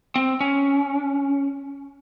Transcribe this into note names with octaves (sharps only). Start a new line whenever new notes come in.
C4
C#4